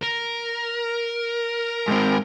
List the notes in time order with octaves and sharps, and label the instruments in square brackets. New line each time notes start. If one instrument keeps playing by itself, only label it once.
[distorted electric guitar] A#4
[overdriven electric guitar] G#2 C4